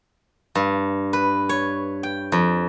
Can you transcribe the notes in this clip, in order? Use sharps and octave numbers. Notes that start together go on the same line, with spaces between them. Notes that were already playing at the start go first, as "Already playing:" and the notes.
G2
B4
C#5
G5
F2